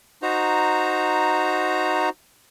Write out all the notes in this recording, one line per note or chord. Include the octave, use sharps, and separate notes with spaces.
D#4 F#4 C5 A#5